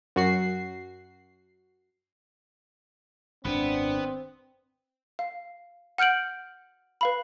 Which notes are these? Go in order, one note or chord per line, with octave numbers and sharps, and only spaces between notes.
F#2 F#4 C7
G#1 F#2 C3 B3 C4 D4
F5
F#5 F6 G6 D7 F#7
B4 F5 B5